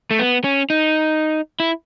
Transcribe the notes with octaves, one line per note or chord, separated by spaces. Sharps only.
A3
B3
C#4
D#4
E4